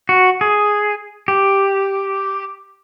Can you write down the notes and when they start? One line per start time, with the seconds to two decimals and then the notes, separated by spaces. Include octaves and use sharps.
0.09 F#4
0.41 G#4
1.28 G4